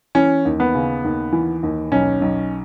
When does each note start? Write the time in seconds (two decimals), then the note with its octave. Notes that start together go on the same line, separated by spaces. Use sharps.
0.15 E3 C#4
0.45 D#2
0.60 B3
0.75 C#3
1.04 D#2
1.33 E3
1.63 D#2
1.92 B1 C#4
2.22 B1